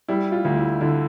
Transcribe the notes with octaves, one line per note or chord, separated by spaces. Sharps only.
G3 E4
F4
D2
E4
D3 E4